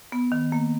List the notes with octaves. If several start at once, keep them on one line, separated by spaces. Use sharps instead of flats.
B3
D#3
A#3